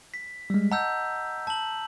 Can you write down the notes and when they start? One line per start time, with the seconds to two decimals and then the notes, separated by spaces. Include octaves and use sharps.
0.14 B6
0.50 G3 G#3
0.72 D#5 F#5 A5 A#5 E6 G6
1.47 A5 F#7